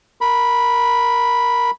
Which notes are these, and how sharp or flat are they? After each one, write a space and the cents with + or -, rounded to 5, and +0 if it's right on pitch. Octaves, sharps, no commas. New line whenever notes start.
A#4 +0 B5 -5